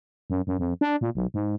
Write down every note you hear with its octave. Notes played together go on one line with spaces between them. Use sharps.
F#2
F#2
F2
D4
A#2
B1
G#2